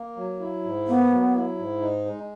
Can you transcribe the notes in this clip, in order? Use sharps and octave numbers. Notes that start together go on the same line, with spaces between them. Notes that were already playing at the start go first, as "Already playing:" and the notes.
Already playing: A#3
F#3
E4
G#2
A#3 B3
F#3
E4
G#2
D#4
G#3